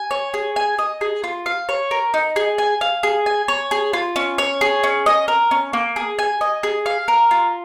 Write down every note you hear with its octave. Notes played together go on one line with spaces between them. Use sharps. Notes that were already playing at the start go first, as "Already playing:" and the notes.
Already playing: G#5
C#5
G#4
G#5
D#5
G#4
F4
F5
C#5
A#4
D#4
G#4
G#5
F5
G#4
G#5
C#5
G#4
F4
C#4
C#5
G#4
C#4
D#5
A#4
C#4
A#3
G#4
G#5
D#5
G#4
F5
A#4
F4